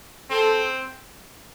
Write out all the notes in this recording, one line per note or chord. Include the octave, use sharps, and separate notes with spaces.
C4 A4